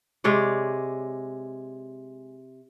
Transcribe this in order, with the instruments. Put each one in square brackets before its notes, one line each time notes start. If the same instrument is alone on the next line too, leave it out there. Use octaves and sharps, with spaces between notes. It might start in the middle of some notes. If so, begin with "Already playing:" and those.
[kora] C3 G#3 C#5 D5